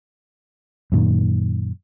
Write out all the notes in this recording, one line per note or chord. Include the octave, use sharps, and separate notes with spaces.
F#2 A#2 D#3